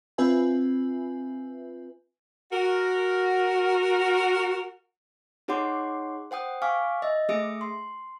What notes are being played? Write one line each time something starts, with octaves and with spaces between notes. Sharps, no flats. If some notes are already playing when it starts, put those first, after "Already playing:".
C4 F4 B4 E5 G#5
F#4 A#4
D#4 G#4 C#5 F#5 C6 D6
C5 F#5 G5 D#6
F5 G#5 C#6 D6 F6
D#5 E5
A3 G#4 E5 D#6 C#7 D7
C6